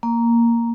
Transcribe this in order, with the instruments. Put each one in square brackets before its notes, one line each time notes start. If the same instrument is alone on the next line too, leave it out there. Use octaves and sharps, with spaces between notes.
[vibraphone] A#3